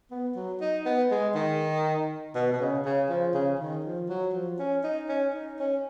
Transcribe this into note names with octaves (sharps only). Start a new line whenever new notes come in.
B3
F#3
D#4
B3
G#3
D#3
B2
B2
C#3
C#3
F3
C#3
D#3
F3
F#3
F3
C#4
D#4
C#4
D#4
C#4